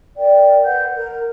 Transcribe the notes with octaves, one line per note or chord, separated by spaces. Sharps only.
A#4 D5 G5
B4 F#5 G6
A#4